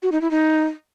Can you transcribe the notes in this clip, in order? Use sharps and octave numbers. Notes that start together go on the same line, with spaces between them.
F#4
D#4
E4
D#4